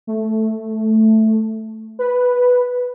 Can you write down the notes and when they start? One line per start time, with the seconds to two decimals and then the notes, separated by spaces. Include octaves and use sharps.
0.07 A3
1.99 B4